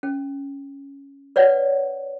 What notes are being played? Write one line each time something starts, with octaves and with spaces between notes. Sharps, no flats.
C#4
B4 C#5 D5 F#5